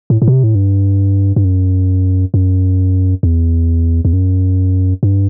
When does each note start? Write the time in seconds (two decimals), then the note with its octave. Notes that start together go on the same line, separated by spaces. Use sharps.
0.10 A2
0.22 A2
0.28 B2
0.32 C3
0.44 A2
0.55 G2
1.36 G2
1.45 F#2
2.34 F#2
3.23 E2
4.05 E2
4.13 F#2
5.03 G2